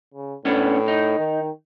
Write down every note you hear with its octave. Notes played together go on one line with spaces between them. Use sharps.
C#3
A2 B3 C#4 D4
D#4
D#3